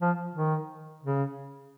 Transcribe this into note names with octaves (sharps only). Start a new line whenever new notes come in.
F3
D#3
C#3